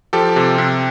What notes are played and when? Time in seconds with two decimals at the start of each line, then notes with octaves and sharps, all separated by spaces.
0.13 F3 G4 A4
0.36 C3
0.58 C3